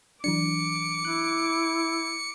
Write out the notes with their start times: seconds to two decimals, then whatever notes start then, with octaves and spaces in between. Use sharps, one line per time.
0.24 E3 F#3 D4 D6 C#7
1.05 E4 F#6